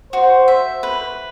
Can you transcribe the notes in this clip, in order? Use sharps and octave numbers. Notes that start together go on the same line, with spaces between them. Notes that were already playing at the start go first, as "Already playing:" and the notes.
F#4 C5
E5
B4